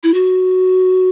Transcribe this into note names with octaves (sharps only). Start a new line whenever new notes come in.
E4
F#4